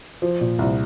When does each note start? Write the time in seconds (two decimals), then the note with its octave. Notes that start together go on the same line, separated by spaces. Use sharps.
0.22 F3
0.41 A#2
0.59 C2